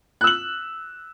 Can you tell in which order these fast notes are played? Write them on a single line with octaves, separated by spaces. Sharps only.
F#6 E6 F#7